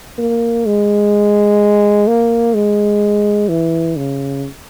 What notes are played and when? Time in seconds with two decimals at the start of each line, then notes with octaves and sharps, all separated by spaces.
0.18 A#3
0.66 G#3
2.08 A#3
2.54 G#3
3.49 E3
3.97 C#3